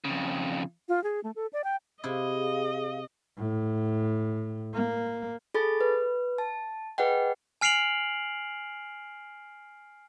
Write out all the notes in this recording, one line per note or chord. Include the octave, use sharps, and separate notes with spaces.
F2 C#3
F4
G#4
A3
A4
D5
G5
C3 E4 G#4 D#5 F5
A2
A#3
G#4 A4 B5 A6
B4
A5
G#4 B4 D#5 F#5 G5
G#5 F6 C7 D7 F7 F#7